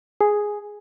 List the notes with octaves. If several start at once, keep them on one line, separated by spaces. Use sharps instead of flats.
G#4